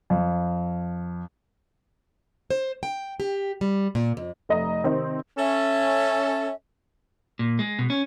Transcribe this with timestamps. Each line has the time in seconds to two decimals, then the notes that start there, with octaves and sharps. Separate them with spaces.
0.10 F2
2.50 C5
2.83 G5
3.20 G4
3.61 G3
3.95 A#2
4.17 F2
4.49 F1 A3 D#5 A#5
4.84 C3 D#3 C4 D#4
5.39 C#4 A4 E5
7.39 A#2
7.59 G#3
7.79 B2
7.90 C#4